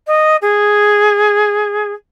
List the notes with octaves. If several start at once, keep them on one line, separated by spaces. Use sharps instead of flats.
D#5
G#4